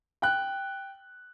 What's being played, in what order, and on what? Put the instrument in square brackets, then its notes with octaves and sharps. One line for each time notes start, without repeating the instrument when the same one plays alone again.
[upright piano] G5 F#6